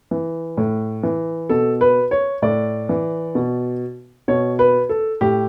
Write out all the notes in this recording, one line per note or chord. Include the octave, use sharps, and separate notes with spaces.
E3
A2
E3
B2 A4
B4
C#5
A2 D5
E3
B2
B2 C#5
B4
A4
A2 G4